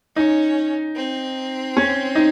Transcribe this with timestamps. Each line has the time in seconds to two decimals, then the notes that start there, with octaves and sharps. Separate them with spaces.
0.16 C#4 D#4
0.96 C4
1.77 C#4
2.15 D#4